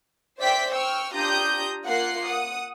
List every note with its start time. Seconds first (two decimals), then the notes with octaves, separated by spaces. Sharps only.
0.39 C5 D5 E5 G5 B6
0.72 G5 C#6 E6 F6
1.14 D4 F4 G4 A#5 D#6 G6
1.86 A#3 F4 F#5 F#6 C7
2.25 F#5 D#6